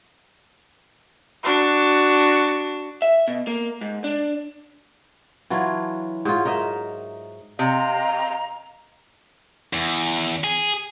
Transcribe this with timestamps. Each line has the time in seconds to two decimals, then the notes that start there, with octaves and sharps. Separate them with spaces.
1.43 D4 F#4
3.02 E5
3.28 B2
3.47 A#3
3.81 G#2
4.04 D4
5.50 E3 F#3 D4 F4
6.25 G#2 F#3 F4
6.45 D#4 A#4 D#5 E5
7.59 C3 D#5 F5 A#5
9.73 E2
10.44 G#4